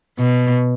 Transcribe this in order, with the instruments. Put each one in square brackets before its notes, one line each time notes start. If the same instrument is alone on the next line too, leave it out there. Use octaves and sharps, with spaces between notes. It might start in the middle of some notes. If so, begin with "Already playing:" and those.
[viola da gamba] B2